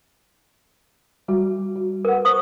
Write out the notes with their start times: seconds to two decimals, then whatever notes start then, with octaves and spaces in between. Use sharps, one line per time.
1.28 G3 F#4
1.76 F#4
2.05 A#4 B4 F#5
2.25 C5 C#6 D#6